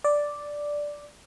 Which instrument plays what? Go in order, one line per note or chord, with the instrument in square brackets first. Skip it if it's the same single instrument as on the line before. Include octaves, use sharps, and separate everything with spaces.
[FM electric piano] D5